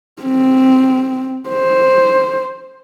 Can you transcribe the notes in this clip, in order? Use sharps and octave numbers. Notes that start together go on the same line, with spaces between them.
C4
C5